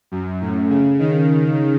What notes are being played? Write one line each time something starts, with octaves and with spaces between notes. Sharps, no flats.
F#2
A2
C#3
D#3